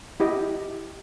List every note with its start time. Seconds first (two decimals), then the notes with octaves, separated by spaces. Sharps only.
0.20 E4 G4 D#5